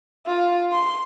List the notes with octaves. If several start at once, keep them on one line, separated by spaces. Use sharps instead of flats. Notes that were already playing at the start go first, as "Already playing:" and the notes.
F4
C6